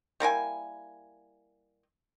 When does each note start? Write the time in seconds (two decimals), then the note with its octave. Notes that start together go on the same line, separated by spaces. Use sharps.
0.20 G3 A#3 E4 G#5